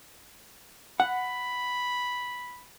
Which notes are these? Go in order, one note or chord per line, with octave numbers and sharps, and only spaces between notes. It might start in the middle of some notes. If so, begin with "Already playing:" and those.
F#5 B5